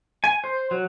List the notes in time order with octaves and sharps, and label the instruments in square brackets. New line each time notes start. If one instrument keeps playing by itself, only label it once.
[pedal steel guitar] G#5
C5
F#3